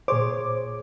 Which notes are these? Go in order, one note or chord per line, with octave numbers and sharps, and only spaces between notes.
A#2 G#4 C5 C#5 D6